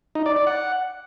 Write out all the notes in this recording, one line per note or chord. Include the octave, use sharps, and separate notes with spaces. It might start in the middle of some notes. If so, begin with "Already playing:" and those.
D#4
D5
D5
F#5